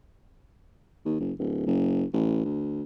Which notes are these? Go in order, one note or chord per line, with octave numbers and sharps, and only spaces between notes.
D#2
F#1
D1
F#1
A1
D2